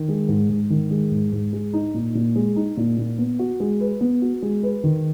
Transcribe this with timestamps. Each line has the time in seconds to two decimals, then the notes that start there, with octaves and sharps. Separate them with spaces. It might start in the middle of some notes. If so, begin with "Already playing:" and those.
Already playing: D#3
0.09 G#3
0.29 G#2
0.49 G#2
0.70 D#3
0.91 G#3
1.12 G#2
1.33 G#2
1.53 G#3
1.73 D#4
1.94 A#2
2.15 A#2
2.36 G#3
2.56 D#4
2.77 A#2
2.98 A#2
3.18 B3
3.39 F#4
3.60 G#3
3.81 B4
4.01 B3
4.22 F#4
4.42 G#3
4.63 B4
4.84 D#3